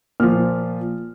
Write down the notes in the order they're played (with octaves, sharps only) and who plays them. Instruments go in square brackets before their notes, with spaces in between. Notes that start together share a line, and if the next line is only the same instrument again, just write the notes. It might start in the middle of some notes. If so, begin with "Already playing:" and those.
[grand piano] A#2 F3 F6